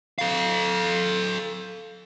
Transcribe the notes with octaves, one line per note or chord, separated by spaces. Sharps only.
A4 F5